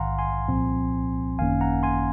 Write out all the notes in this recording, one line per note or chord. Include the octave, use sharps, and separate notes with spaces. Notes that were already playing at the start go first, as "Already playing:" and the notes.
Already playing: A#1 G#2 D#3 F5 F#5 G#5 A#5 C6
G#5 C6
C2 A#2 F3 C4
G#1 F#2 D#3 A#3 C#4 F5 G#5
F#5 A#5
G#5 C6